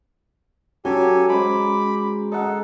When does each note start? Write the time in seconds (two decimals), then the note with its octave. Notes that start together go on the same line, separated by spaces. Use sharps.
0.85 F#3 C#4 F#4 G4 A4 G#5
1.29 G#3 C5 B5 D6
2.32 D#4 A4 F#5